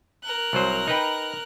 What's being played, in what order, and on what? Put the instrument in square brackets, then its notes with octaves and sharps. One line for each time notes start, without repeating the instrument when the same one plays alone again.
[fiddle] A#4 F#6
[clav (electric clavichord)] C2 F#3 C5
D#4 B4 G5